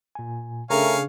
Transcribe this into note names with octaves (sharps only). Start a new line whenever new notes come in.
A#2 G#5
C#3 A3 D4 G#4 A#4 C#5 F5 G#5